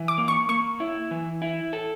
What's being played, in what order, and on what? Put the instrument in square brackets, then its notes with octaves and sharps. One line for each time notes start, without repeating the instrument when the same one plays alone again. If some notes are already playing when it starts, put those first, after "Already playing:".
Already playing: [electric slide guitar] E3
[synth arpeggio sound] D6
[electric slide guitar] A#3
[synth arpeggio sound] C#6
[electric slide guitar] A#3 [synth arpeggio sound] C#6
[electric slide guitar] E4
E3
E4
A4